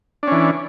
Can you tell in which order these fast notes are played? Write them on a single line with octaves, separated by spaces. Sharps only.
D4 C#4 E3